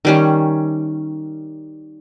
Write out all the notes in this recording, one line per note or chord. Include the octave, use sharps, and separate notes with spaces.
D#3 G3 C#4